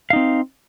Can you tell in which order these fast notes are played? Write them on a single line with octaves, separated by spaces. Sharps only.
F5 D#4 C4